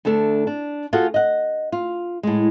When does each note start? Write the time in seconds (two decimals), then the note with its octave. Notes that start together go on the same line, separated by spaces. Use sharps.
0.05 D2 A3 D4 A4
0.47 D4
0.93 F4 F#4 G#4 A4 F#5
1.14 D#5 F#5
1.72 F4
2.23 A2 G#3